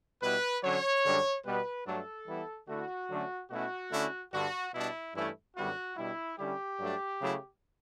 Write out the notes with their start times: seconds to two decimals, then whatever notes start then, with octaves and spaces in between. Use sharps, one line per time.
0.22 B2 G3 B3 E4 B4
0.63 D3 F#3 C#4 C#5
1.04 F#2 D3 G3 D4
1.45 B2 G3 B3 B4
1.86 G2 F#3 A3 D4 A4
2.28 E3 G3 B3 E4
2.69 D3 A3 E4 F#4
3.10 D3 F#3 A3 C#4
3.51 B2 A3 C#4 E4 F#4
3.91 D3 A3 C#4 E4
4.33 G2 D3 G3 D4 F#4
4.74 B2 G3 D4 E4
5.15 G2 E3 A3 C#4 E4
5.56 F#2 D3 G3 B3 E4 F#4
5.97 B2 G3 D4 E4
6.38 D3 G3 C#4 E4 G4
6.79 G2 F#3 A3 D4
7.21 C#3 F#3 A3 E4